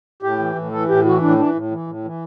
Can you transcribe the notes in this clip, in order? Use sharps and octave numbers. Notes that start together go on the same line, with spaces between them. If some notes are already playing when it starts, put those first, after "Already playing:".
A2 G4
E3
A2
E3 A4
A2 G4
E3 F#4
A2 D4
E3 D4
A2
E3
A2
E3